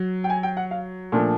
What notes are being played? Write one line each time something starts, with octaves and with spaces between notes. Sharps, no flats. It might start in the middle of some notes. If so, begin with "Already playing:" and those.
Already playing: F#3
G5
G#5
G5
F#5
F5
A#2 F3 A3 D4